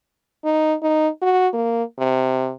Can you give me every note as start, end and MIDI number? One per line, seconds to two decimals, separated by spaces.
0.44 0.75 63
0.82 1.08 63
1.22 1.48 66
1.53 1.83 58
1.99 2.52 48